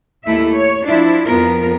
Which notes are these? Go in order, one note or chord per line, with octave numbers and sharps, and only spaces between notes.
D#2 A3 E4 E5
C#5
F3 D4 E4
F2 F3 B3 A#4